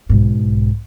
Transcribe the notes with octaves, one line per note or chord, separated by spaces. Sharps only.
B1 G#2